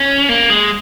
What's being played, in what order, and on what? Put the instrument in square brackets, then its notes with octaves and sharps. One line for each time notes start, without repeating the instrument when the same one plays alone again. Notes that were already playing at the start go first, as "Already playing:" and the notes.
Already playing: [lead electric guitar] C#4
A#3
G#3